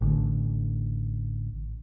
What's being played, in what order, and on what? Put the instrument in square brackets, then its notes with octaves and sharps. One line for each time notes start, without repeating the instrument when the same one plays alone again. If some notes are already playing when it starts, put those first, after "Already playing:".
[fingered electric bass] A1 D3